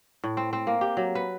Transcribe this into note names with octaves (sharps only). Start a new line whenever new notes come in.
A2
C4
C4
A#3
G4
F#3
B4